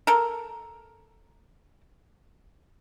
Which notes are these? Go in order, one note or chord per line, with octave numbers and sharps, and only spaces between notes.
A4 A#4